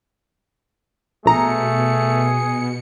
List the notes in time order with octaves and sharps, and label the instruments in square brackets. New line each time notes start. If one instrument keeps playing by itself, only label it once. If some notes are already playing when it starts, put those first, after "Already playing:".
[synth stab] A#1 A#5 [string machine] B2 C#7 [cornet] A3 [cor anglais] G#4